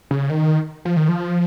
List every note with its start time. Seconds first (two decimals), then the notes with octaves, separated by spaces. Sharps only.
0.11 C#3
0.30 D#3
0.85 F3
0.97 D#3
1.09 F3